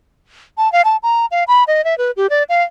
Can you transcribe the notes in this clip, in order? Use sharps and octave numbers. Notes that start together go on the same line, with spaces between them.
A5
F5
A5
A#5
F5
B5
D#5
E5
B4
G4
D5
F5